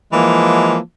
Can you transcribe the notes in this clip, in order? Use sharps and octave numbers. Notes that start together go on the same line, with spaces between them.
E3 F3 G#3 A#3